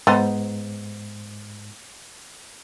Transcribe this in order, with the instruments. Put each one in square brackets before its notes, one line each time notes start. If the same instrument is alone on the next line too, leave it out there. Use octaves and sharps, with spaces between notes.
[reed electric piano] G#2 [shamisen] B3 D#4 C5